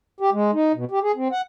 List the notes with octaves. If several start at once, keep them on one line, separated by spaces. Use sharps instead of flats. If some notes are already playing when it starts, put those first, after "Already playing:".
G4
G#3
D#4
B2
G4
G#4
C4
F#5